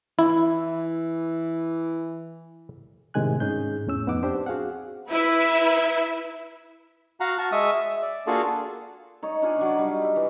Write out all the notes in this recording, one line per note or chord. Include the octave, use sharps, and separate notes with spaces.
E3 E4
A2 C3 D#3 G#3 G#5 F#6
G#2 C#4 D#4 G#4 G6
E2 A2 C#4 E6
F2 B3 D#4 F#5 D6
C4 D4 G4 C5
F#4 G#4 F5 F#5
E4 B4 E5
F#4 F5 F#5 A#5
F#4 A5 C#6 F6
G#3 E5 C#6 D#6
E5
D5
A#3 D4 F4 F#4 G#4 A4
D#4 C#5 D5
D4 F4 G#5
F#3 D4 F4
G3 D#4
E5
E3